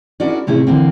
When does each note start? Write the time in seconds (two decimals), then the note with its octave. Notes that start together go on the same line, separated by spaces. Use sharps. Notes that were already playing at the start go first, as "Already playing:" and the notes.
0.20 C#4 D4 E4 F#4 A#4 D5
0.47 A2 C3 C#4 E4 G#4 E5
0.67 D3 E3 A#3 C4